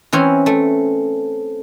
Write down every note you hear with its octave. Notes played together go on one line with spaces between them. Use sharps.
E3 C4 C#4
A3